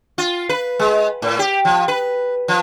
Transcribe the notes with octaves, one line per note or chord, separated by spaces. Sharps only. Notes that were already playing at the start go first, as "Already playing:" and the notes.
F4
B4
G#3
A2
G4
F3
B4
F3